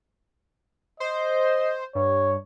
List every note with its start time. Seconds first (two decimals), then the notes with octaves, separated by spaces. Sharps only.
1.00 C5 D#5
1.95 G2 C#5